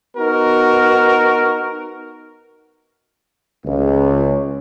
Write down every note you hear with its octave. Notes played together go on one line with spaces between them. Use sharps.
B3 D#4 F#4 A#4
C#2